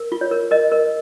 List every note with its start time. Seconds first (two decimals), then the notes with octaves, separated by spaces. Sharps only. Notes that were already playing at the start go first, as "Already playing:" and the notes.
Already playing: A#4
0.12 F4
0.21 C#5
0.31 A#4
0.51 A#4 D#5
0.72 A#4